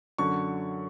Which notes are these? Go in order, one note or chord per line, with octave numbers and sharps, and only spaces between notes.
F#2 D3 F#3 C#6